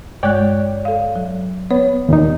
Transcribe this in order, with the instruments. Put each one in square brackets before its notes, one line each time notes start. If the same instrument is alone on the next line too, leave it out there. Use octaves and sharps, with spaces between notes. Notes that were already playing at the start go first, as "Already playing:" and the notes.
[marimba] G2 G#3 F#6 [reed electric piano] C#5 D5 G5
[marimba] A4 F5
F#3
[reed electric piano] B3 [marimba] C#5
[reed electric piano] D#2 A#2 D#4